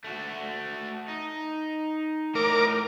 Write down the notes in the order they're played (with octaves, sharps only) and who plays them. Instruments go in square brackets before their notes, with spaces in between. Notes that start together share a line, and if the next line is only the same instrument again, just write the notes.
[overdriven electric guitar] A3 F#4
D#4
[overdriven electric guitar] A2 D#4 [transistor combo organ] A#4 D6